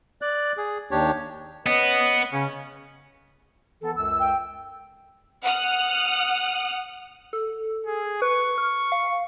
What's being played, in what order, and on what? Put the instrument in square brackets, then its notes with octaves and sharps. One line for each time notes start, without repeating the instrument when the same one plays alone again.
[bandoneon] D5 F#6
G#4
D#2 D4 G4 C#5
[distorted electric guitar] B3 [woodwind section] C#4 B4 D#5
[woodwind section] C#3 C#4
E3 B3 A4
C#2 F#2 E6
[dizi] G5
[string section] F#5 D#6 F6 F#6
[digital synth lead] A4
[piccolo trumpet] G#4
[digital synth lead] B4 [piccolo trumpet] C#6
[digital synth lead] F6
F5